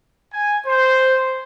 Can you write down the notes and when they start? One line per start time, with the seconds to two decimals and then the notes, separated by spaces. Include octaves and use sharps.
0.32 G#5
0.66 C5